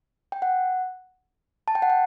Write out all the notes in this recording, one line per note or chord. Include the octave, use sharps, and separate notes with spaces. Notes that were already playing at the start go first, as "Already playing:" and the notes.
G5
F#5
A5
G5
F#5
G5